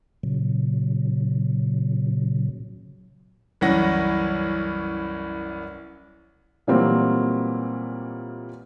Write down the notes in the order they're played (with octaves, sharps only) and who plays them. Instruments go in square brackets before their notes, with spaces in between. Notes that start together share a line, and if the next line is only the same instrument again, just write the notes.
[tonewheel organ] A#2 C#3 F#3
[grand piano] C2 F#2 E3 C#4 F#5 A#6
[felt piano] A#2 E3 F#3 G3 A#3 C4